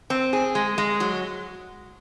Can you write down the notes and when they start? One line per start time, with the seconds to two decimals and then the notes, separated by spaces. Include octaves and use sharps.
0.10 C4
0.33 G#4
0.55 G#3
0.78 G#3
1.00 F#3